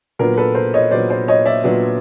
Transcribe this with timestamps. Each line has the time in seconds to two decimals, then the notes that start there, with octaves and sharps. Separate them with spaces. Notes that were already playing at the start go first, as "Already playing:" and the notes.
0.19 A#2 F#3 B3 D4 A#4
0.37 A4 B4
0.55 A#4 C5
0.74 C#5 D#5
0.91 A#2 F#3 B3 D4 C5 D5
1.10 C5 D5
1.28 C#5 D#5
1.46 D5 E5
1.64 A#2 F#3 B3 D4